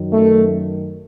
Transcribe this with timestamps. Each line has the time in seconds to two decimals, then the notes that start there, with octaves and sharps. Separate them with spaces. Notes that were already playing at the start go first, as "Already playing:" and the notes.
Already playing: F#2 D#3
0.11 A3